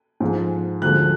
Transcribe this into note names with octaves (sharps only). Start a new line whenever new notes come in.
G#2 F3 G#3
D2 D3 F3 G#3 F#6